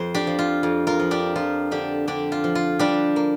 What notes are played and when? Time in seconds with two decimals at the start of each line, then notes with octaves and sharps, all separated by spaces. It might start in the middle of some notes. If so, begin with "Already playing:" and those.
Already playing: F2 C5
0.14 D4 G4
0.27 F3
0.39 F4
0.63 F2
0.87 F4 A#4
1.00 F3
1.11 D4 G4
1.36 F3 F4
1.71 D3 D4 G4
2.07 D3 D4 G4
2.32 F4
2.44 F3
2.55 F4
2.79 G3 D4 G4
3.16 A#3